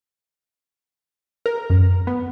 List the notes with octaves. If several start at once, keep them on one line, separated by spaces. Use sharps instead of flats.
A#4
F#2
B3